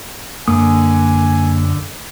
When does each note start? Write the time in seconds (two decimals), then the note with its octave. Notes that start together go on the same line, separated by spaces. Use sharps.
0.48 F#2 D3 A#3 G#5 D#6